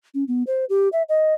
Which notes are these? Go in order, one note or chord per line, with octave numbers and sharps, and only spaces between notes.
C#4
B3
C5
G4
E5
D#5